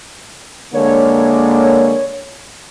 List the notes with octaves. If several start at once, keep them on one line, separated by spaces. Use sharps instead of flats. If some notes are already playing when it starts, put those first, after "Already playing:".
D3 G#3 A#3 C#5